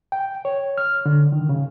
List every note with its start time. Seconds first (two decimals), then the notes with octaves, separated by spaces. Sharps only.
0.12 G5
0.45 C#5
0.78 F6
1.06 D3
1.32 D#3
1.49 C#3